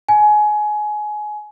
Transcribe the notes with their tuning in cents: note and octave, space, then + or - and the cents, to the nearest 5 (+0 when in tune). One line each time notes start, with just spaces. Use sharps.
G#5 +25